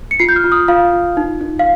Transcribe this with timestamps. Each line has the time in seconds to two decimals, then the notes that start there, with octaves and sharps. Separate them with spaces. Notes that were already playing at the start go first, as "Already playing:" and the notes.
0.11 C#7
0.20 F4 C7
0.29 G6
0.36 F6
0.44 F4
0.52 D#6
0.68 F4 F5
0.93 F4
1.17 D#4
1.41 D#4
1.59 F5